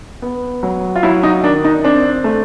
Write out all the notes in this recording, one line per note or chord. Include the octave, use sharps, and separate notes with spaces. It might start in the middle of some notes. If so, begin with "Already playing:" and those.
B3
F#3
F4
F#3 E4
D#4
D#3 D4
D#4
C4 D4
A3